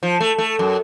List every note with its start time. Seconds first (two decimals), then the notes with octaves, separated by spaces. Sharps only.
0.03 F3
0.21 A3
0.38 A3
0.59 F#2